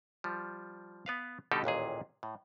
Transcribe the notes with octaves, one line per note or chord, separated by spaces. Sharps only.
F3 G3
B3 B4 F5
B2 D3 G3 D#4 G4 A4
A1 D#2 A#2 G#4
A2